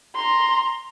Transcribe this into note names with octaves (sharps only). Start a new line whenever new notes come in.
A#5 C6